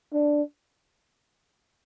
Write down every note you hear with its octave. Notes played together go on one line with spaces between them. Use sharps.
D4